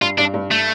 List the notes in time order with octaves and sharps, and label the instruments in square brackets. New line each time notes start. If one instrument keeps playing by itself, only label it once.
[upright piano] G2 [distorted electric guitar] F4
[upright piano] G2 [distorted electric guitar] D4
[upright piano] G2
[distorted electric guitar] A3